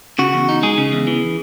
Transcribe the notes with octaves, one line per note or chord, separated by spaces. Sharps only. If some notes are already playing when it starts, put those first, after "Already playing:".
C#3 F#4
E2
D#4
G#3 G#4
C#3
E2
E3